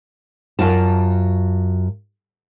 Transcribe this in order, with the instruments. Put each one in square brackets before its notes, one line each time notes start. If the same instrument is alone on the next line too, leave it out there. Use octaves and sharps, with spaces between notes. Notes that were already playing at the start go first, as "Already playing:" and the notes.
[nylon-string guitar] F#2 F4 A5